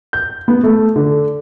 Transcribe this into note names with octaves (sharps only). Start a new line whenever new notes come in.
G6
B3
A3
D3